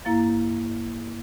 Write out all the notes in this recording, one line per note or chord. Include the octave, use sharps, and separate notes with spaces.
G2 A#3 E4 F5 A#5 A6